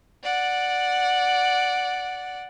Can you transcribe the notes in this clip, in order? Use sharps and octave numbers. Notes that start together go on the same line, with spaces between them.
D5 F#5